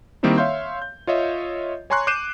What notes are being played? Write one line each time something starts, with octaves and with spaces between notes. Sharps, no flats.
D#3 G3 A#3 C4 D#4 E4
C#5 E5 F5 C6 G6
G6
F4 C#5 D#5 E5
C#5 G#5 A#5 C6 C#6 F#6
D6 F#6 G6 C7 D#7 E7